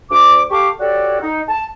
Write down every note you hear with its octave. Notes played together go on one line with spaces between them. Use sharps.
D2 D6
G4 A4 F5 C#6 D6
F#4 G4 A4 C#5 D5
D#4
A5